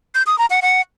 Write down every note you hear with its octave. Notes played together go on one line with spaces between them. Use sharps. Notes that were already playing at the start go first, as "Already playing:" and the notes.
G6
D#6
A#5
F#5
F#5